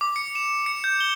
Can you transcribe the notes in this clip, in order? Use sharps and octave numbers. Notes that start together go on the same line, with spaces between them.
D6
C#7
E7
C#7
G6
G7